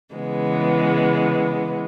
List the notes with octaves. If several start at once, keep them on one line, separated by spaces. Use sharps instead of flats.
C#3 E3 G#3 B3